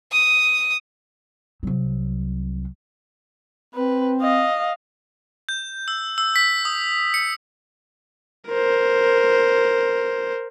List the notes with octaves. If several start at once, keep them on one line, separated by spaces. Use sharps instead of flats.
D#6
C2 F#3
C4 B4
D#5 F5
G6
E6
E6
B6
D#6
C#7
A#4 C5